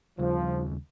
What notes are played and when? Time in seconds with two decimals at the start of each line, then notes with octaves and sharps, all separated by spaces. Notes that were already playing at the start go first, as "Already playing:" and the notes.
0.19 D#2 C#3 F3 G3